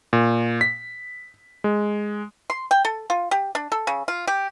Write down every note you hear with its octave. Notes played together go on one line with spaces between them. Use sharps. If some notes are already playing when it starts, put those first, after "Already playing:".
A#2
B6
G#3
C6
G5
A4
F4
G4
D4
A4
C#3
F4
G4